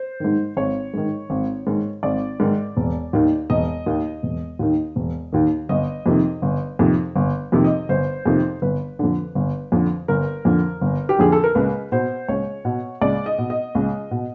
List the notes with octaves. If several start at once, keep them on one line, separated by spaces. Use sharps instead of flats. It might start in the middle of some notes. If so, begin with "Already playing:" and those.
Already playing: C5
G#2 D#3
G#1 C#5
G#2 D#3
G#1
G#2 D#3
G#1 D5
G#2 D#3
E1
D#2 D#3
E1 D#5
D#2 D#3
E1
D#2 D#3
E1
D#2 D#3
G1 D#5
F2 C3 D#3
G1
F2 C3 D#3
G1
F2 C3 D#3
D#5
G1 C5
F2 C3 D#3
G1 B4
F2 D3
G1
F2 D3
G1 A#4
F2 D3
G1
G4
F2 D3 G#4
A4
A#4
C#2 B4
B2 C5
C#2 C#5
B2
C#2 D5
D#5
B2
D#5
C#2
B2